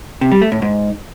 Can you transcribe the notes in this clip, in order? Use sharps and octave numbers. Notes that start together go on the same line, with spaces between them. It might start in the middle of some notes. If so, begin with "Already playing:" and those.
C3
G3
A3
A2
G#2